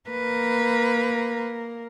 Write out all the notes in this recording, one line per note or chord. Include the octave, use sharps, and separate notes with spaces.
A#3 A#4 B4